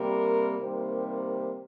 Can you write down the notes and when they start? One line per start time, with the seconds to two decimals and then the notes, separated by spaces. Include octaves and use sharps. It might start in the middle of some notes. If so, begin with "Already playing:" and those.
Already playing: C3 G3 A#3 A#4
0.59 C3 D#3 G3 A#3 C5
1.06 C5